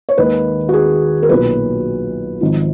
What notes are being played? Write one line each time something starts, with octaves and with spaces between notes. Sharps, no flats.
C#5
D#2 D#3 G#3 B4
F#4
G#4
A#4
B1 A#2 F#3 B4
G#1 G#2 F3